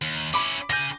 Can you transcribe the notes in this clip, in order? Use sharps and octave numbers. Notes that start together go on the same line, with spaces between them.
D#2
C#4 E4 B5 D6
C#3 G#5 G6 A#6